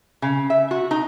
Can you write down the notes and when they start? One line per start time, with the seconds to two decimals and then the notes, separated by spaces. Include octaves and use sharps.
0.22 C#3
0.50 E5
0.71 F#4
0.91 D#4